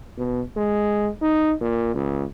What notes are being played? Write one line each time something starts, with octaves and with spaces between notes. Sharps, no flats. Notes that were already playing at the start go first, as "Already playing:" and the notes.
B2
G#3
D#4
A#2
C#2